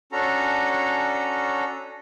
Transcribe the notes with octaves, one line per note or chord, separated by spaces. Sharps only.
C#4 D4 F#4 A4 A#5